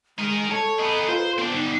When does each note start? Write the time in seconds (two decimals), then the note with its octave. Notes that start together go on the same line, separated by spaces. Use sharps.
0.18 G#3 D#4 A#4
0.51 A4 C#5 A5
0.79 B3 G#4 D#5 A#5 B5
1.08 F4 B4 C5 F5
1.39 B3 C4 D4
1.53 D3 G3 D#4